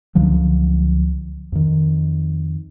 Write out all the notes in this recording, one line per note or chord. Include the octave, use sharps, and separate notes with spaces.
C#2 D3 F3 F#3
F2 D#3